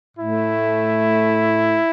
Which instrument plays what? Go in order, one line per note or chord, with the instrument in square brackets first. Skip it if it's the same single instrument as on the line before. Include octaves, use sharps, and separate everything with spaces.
[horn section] A2 A3 E4